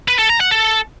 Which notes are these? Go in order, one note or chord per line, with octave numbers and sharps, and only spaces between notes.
B4
A4
A#5
F#5
A4